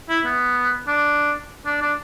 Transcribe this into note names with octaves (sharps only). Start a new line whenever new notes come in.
E4
B3
D4
D4
D4